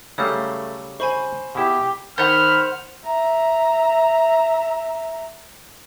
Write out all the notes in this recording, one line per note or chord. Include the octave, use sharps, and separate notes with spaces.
C#3 F#3 G3 A3 C#5 F5
C5 G#5 B5 C#6
B2 E4 G4
D#3 C5 F#5 B5 F6
E5 A#5